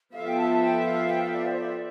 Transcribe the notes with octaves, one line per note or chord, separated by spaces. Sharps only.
F3 B3 F4 A4 E5 F5
G5
A5
G5
F5
G5
F5
D5
C5
D5